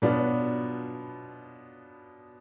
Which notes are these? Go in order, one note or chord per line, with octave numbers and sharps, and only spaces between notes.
B2 F#3 B3 D4 F4